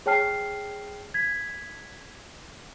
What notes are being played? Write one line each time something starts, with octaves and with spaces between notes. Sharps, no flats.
G#4 C#5 G5 A5 F6 C7
G#6 B6